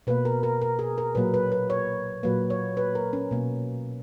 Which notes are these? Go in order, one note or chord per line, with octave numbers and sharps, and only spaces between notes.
B2 A#3 B4
A#4
A#4
A#4
G#4
A#4
A#2 F#3 A#3 B4
B4
B4
C#5
A#2 F#3 A#3 B4
C#5
B4
A#4
C#4
B2 A#3